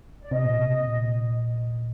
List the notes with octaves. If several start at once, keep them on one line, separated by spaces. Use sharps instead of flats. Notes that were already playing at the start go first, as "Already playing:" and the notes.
D5
C3 D#5
A#2
C3
A#2